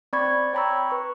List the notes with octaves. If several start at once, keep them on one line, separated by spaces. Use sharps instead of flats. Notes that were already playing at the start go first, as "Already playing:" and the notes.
C4 D5 B5 C#6 G#6
C#5 G5 A#5 B5 C#6 E6
B4 C#6